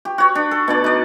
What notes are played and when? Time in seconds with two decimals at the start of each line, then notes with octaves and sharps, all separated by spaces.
0.05 G4
0.18 F#4 C#5
0.35 D4
0.51 A4
0.68 B2 D4 D5
0.84 D#4 D5